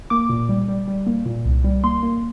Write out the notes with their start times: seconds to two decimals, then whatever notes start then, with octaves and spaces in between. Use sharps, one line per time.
0.10 A#3 D6
0.29 A#2
0.49 G3
0.68 G3
0.88 G3
1.07 A#3
1.26 A#2
1.45 C2
1.64 G3
1.84 A#3 C6
2.03 A#3